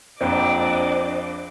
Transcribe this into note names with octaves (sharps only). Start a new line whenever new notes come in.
A#1 F2 D4 C5 D5 D#5 D6